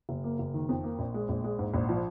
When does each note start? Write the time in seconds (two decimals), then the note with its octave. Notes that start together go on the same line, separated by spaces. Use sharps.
0.09 F#1
0.24 A#3
0.39 F#1
0.54 D#3
0.69 F2
0.84 A#3
0.99 A#1
1.14 G#3
1.29 A#1
1.44 G#3
1.59 G#2
1.74 A#1
1.89 F3